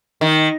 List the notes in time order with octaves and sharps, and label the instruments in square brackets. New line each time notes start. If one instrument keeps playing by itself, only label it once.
[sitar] D#3